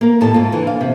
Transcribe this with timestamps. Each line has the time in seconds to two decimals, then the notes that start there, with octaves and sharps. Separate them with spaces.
0.01 A#3 A#4
0.21 D#2 A2 A4 A5
0.34 G#2 F4
0.52 D3 E3
0.67 F5
0.81 C3